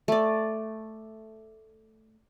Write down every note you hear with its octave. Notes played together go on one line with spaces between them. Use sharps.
A3 D5